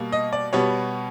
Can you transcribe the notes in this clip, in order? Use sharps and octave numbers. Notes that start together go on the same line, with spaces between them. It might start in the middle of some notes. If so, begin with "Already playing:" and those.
Already playing: B2 G3 A#3
D#5
D5
B2 G3 B3 C#5